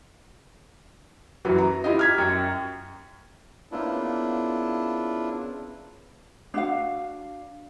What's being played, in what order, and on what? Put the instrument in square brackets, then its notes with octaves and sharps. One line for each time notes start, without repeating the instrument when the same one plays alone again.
[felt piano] F#2 E3 F#3
A#5
E4 F4 G4 D#5
F6 G#6 B6
F#2 G5
[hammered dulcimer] C#3 A#3 B3 [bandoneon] D4 E4 F4
[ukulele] D4 F#4 F5